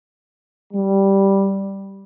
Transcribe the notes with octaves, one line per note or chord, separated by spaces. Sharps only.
G3